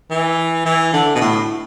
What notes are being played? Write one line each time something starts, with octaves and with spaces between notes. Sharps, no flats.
E3
E3
D3
B2
A2